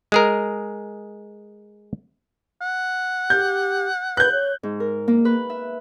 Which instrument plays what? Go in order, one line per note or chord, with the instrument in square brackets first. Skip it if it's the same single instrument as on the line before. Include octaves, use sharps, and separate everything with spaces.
[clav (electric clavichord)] G#3 G#4 A#4
[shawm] F#5
[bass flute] G4 [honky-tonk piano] G6
[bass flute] B4 [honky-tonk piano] F#6 G6
[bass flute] C#5
[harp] G#2
A#4
A#3
B4
E5